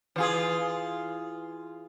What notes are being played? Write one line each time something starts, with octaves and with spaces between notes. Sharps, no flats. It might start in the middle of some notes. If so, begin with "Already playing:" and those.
E3 F4 G#4